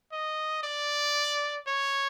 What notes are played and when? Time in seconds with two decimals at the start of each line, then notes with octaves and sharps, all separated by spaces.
0.12 D#5
0.63 D5
1.67 C#5